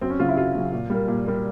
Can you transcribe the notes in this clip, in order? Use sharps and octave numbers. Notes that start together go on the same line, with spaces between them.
F#2 C4
C#4
C#3 F#3 F4
E4
F#2 F4
C#3 F#3
A#2
G3 A#3
A#2
G3 A#3